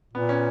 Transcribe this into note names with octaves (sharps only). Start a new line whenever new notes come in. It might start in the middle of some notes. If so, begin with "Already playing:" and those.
A#2 B3
C#4